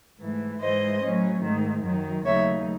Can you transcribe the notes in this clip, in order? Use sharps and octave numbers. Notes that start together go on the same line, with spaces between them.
G#2 E3 A3
G#2 E3 G#3 C5 D#5
A2 F#3 C#4
G#2 D#3 A3
F#2 D#3 F#3
D#2 C#3 F#3 A3 D#4 C#5 E5